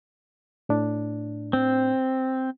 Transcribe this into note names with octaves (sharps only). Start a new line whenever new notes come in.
A2 D4
C4